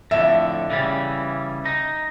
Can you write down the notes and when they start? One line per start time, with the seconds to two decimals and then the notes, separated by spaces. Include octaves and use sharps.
0.11 F2 A2 D3 E5
0.70 C#3 E3 G3
1.65 D#4